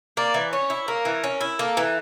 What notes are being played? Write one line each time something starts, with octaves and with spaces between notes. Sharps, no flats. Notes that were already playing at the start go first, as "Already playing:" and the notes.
A#3 D5
E3
C#4 C#5
E4
A#3 A#4
E3
C#4
E4
A#3 A4
E3